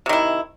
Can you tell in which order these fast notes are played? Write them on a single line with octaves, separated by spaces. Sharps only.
C3 D#3 E4